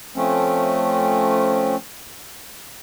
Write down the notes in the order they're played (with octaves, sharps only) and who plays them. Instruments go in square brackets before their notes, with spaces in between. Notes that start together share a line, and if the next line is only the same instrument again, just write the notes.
[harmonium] F3 A3 C4 C#4